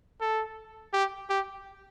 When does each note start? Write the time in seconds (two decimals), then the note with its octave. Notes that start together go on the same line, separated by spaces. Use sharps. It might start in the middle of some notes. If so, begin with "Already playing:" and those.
0.21 A4
0.93 G4
1.29 G4